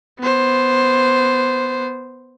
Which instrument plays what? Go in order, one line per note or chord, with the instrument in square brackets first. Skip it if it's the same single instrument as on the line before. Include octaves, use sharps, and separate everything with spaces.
[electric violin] B3 C5